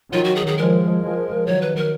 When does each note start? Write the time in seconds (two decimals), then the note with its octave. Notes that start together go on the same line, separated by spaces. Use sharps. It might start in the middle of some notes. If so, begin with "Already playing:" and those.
0.13 D#3 F#3 F4
0.24 F#4
0.35 G#4
0.47 G#4
0.57 F3 G#3 A#4
1.02 F3 G#3
1.46 D#3 F#3 C#5
1.61 B4
1.76 A#4